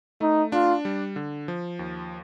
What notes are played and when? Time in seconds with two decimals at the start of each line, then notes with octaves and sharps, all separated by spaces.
0.21 A3 D#4
0.52 D4 F4
0.85 G3
1.16 D3
1.48 F3
1.79 D#2